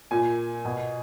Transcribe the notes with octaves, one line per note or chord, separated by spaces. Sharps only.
A#2 G#5
B2